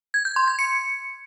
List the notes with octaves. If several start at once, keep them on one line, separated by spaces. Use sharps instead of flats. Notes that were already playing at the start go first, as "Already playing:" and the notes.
G#6
G6
C6
G#6
C#7